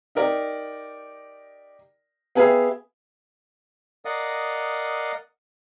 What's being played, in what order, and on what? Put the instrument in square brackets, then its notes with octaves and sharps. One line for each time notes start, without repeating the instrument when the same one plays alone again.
[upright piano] D#4 G4 A#4 D5
B3 G4 G#4 B4 E5 F5
[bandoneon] A#4 D5 D#5 F5 F#5 D#6